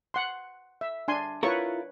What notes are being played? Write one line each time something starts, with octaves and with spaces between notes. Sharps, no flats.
F#5 C6
E5
D4 G#5 C6
E4 F4 A#4 B4 C#5 C#6